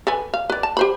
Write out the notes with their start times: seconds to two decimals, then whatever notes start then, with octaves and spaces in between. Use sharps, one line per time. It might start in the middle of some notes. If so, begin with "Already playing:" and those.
0.07 A4 B4 G#5
0.34 F5
0.50 B4 D5
0.63 A5
0.77 G4 C5 B5